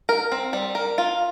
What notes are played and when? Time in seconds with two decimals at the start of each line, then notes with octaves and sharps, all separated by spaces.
0.09 A#4
0.32 C4
0.53 G3
0.75 A#4
0.98 F4